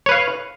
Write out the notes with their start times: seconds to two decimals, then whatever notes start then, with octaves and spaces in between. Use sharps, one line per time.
0.06 C#5
0.09 B4
0.12 F5